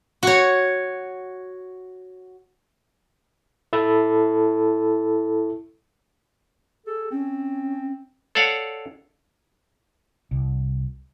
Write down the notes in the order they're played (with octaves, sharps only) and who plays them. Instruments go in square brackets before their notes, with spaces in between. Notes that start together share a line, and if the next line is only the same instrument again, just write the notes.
[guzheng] F#4 C#5
[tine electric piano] E4 A4 A5
[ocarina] G#4 [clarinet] A4
[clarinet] C4 [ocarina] C#4
[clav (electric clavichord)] A4 C#5 D5 F5 F#5
[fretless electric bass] C2